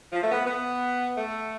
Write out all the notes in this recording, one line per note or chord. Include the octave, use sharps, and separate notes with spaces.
F3
A3
B3
B3
A3